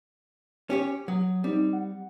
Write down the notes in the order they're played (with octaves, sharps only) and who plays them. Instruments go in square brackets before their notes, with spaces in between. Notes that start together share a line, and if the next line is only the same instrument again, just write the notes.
[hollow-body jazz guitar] C#4 G4 C#5
[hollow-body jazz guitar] F#3 [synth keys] D#6
[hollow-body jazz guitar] G3 [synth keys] C4 D#4
[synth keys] F#5